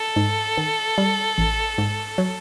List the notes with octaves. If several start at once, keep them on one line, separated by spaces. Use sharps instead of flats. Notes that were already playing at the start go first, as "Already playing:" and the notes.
Already playing: A4
G#2
D#3
G3
A1
G#2
F#3